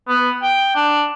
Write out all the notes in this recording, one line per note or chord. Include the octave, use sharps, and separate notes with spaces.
B3
G5
D4